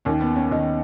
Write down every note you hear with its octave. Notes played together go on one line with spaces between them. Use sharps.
D#2 D#3 C#4
B3
C#4
D#2 D#3 D#4